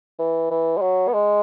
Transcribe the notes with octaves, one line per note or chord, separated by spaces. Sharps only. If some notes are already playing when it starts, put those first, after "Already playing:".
E3
E3
G#3
F#3
B3
G#3